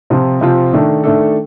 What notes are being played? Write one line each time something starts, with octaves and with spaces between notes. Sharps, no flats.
C3 F3 C4 F4
C3 F3 C4 F4
D#3 A3 D4 A4
D#3 A3 D4 A4